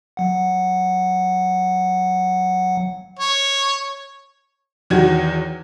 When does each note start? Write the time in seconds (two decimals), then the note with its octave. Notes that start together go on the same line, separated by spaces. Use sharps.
0.17 F#3 F#5
3.19 C#5
4.90 E2 D#3 F#3 F#4 G#6